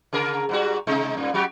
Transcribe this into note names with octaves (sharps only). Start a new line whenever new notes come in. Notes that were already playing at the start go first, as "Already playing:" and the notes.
C#3 G#4 A#4
G#2 G3 F#4
C3 G#3 D#4
G2 A#2
F#3 F#4 G4